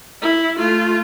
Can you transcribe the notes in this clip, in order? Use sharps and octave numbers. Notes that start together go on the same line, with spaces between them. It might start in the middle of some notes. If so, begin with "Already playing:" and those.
E4
A3 F4